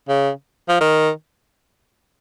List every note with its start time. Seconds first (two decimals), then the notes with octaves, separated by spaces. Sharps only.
0.08 C#3
0.69 F3
0.81 D#3